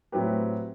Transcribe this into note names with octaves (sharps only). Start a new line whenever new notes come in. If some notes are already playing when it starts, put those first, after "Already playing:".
A2 F#3 C4 G4 B4